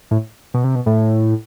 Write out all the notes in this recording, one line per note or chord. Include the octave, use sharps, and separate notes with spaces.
A2
B2
C3
B2
A2